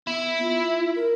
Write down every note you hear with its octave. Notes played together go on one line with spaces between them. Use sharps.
B3 E4
F4
A#4